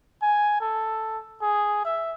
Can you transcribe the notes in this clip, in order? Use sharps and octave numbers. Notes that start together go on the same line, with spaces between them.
G#5
A4
G#4
E5